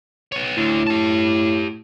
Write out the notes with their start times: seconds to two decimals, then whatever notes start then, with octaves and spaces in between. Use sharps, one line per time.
0.32 B3 C#5
0.57 D2 A2 D3
0.87 G4 A5